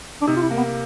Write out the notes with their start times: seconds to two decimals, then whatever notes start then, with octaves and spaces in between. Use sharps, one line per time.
0.22 D4
0.27 C3 D#4
0.36 F4
0.42 E4
0.51 A#3
0.57 B3